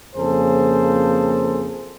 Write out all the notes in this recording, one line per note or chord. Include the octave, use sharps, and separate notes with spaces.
F2 C#3 A#3 G#4 A4 C5